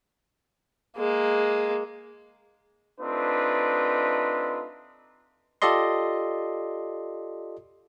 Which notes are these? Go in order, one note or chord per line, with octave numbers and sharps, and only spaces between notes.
G#3 A#3
A3 C4 D4 D#4 F4 B4
F4 G4 A4 D5 D#5 C6